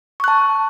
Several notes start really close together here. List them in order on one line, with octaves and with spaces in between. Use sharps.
C#6 F#6 A5